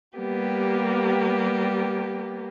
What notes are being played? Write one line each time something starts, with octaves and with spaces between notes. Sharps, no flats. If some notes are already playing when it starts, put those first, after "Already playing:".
G3 A#3 B3 G4